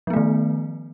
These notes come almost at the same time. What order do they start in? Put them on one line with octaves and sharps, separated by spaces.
F3 B3 A3 D#3